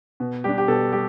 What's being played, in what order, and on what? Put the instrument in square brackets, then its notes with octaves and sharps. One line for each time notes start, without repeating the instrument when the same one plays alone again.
[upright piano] B2
[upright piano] G3 D4 [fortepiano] G4
[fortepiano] G4
[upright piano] B2 [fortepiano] A4
[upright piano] G3 [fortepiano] G4